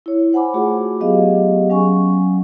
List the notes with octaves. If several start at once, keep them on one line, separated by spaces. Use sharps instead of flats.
E4 C#5
C5 F#5 G#5 B5 D6
A3 F4 F#4 G#4 D6
F#3 B3 G4 G#4 D#5 F5
F#3 C#4 G#5 C#6